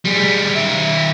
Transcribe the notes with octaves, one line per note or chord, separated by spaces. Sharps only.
G3 G#4
D#3 E5